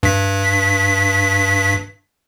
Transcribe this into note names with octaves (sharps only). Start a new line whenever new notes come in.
G2 B6